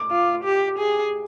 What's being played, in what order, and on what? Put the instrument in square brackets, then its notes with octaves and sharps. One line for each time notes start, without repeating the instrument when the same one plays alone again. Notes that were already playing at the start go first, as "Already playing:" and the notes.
Already playing: [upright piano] D6
[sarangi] F4
G4
G#4